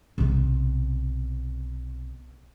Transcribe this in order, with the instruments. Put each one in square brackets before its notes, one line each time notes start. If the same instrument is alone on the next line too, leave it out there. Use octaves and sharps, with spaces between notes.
[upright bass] B1 C3